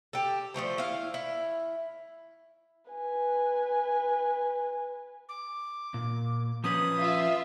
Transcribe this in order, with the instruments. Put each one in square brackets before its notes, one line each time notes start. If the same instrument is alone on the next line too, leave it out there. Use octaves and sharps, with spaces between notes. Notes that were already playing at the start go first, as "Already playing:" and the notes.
[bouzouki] G4 A4
F3 F#3 A3 C5
E4 F5
E4
[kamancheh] B4 G#5
[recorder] D6
[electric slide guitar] A#2
[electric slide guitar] F3 C#4 B4 [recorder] D#6
[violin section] F4 E5